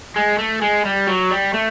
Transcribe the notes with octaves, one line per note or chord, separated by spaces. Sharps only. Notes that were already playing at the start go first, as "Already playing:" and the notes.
G#3
A3
G#3
G3
F#3
G3
A3